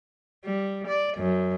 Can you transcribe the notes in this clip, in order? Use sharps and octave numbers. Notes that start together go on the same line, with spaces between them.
G3
D5
F#2